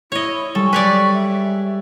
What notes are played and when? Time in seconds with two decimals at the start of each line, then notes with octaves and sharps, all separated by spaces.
0.12 E4 C#5 D#5
0.55 G3 G#3 A4 C#6
0.73 B4 C#5 D5
1.14 E5